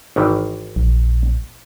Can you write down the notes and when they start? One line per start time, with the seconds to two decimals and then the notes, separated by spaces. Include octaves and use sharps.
0.16 G#1 D#3 E3
0.76 A#1